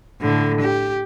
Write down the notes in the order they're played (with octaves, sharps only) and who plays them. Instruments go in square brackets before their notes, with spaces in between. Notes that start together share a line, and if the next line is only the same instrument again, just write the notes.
[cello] A2 D3
G4